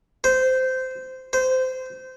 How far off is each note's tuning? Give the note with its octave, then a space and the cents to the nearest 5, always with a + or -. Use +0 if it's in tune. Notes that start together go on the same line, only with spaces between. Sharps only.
C5 -15
C5 -20